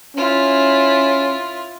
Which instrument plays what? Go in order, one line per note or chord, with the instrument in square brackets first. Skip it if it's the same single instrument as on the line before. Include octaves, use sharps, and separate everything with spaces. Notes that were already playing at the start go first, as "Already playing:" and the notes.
[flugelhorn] C#4 [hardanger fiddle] E4 F4